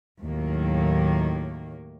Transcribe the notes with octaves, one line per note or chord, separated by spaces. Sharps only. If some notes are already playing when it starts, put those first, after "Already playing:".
D#2 A2 D#3 F#3 A#3